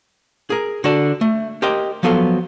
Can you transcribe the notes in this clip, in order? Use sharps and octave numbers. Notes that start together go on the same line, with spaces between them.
G#4 A#4
D3 F#4 D5 A5
A3
G4 A#4 C5 D#5 G5
F3 F#3 B3 A4 F5